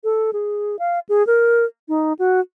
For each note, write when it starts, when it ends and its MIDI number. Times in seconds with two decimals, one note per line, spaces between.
0.04 0.31 69
0.33 0.76 68
0.79 0.99 77
1.09 1.25 68
1.27 1.65 70
1.89 2.13 63
2.19 2.40 66